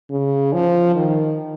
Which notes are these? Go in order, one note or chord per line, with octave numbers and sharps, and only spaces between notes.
C#3
F3
D#3